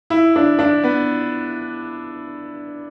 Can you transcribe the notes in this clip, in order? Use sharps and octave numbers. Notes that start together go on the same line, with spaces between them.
E4
D4
D4
B3